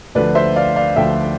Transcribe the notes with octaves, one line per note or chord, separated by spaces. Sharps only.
D2 D3 F3 B4 D5
C5 E5
D5 F5
D5 F5
D2 D3 F3 E5 G5